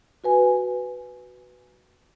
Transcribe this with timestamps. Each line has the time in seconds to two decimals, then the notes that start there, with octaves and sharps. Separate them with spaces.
0.24 F#4 B4 G#5